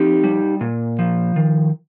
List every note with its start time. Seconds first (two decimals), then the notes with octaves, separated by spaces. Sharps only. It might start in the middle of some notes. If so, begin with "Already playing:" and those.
Already playing: F3 C4 D#4 G4
0.24 G3
0.61 A#2
0.99 F3
1.36 D#3